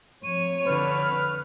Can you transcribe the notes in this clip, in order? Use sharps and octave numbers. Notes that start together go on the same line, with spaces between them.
F2 C#5 D#7
D3 B4 F6